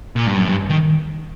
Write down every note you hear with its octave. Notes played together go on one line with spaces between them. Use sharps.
A#2
G2
F#2
G2
D#3